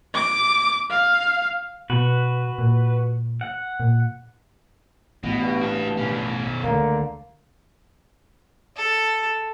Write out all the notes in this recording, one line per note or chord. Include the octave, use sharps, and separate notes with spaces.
D6
F5
B2 F#4 B4
A#2
F#5
A#2
A1 B2
G2
F#4 A5
B2 C#4
C#2 D3 F3 A3 A#3
A4